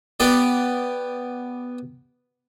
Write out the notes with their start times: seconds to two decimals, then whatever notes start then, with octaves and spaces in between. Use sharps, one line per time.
0.20 B3 G4 D5